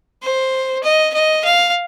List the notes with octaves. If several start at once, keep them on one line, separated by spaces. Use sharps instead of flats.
C5
D#5
D#5
F5